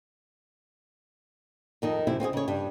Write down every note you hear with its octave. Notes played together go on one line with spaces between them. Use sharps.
F2 D#3 D#4
F#2 C3 E4
C4 C#4 F4 G#4
C#3 C#5
G2 G3